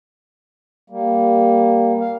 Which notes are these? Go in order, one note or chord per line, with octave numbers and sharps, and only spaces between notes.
G3 A#3
F5